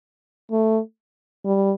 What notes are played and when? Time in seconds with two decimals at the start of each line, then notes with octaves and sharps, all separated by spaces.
0.51 A3
1.45 G3